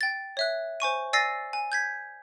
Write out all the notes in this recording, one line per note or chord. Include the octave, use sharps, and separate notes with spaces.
G5 A6
C#5 E5 F#6
C5 G#5 C#6 D#7
D5 G#5 E6 A6 A#6 C7
G#5
G6 G#6 B6